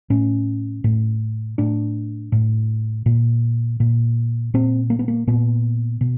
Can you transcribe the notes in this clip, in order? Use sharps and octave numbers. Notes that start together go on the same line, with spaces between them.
A2 C#4
A2
A2 D4
A2
A#2
A#2
A#2 C4
A#3
B3
A#3
A#2 B3
B2